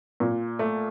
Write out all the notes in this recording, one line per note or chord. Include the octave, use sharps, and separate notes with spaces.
A#2
A3